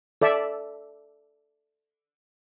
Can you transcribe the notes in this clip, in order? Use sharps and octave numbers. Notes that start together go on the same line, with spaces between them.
A4 D5 E5